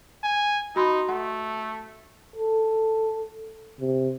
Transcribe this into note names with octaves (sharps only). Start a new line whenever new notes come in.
G#5
D#4 F#4 B5 C6
A3 F#5
A4
C3